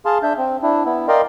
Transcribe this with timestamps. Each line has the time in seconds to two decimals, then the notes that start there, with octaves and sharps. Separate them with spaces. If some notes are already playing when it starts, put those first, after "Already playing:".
0.06 G#4 F5 A5 C6
0.23 D4 E5 G6
0.38 C4
0.63 D4 E4
0.85 B3 E4
1.08 A#4 D5 D#5 F5 G5 C6